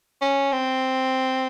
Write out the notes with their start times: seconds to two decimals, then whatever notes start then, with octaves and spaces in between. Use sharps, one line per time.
0.22 C#4
0.53 C4